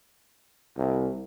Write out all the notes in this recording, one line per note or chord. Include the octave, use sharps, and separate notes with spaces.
C2